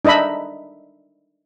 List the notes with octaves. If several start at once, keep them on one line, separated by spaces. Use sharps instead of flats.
D4 D#4 D#5 E5 B5